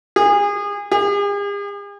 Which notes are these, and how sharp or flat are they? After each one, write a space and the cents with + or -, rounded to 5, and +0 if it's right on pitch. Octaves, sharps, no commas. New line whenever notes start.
G#4 -30
G#4 -45